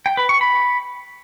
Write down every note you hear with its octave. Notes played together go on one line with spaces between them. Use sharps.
G5
B4
C#6
B5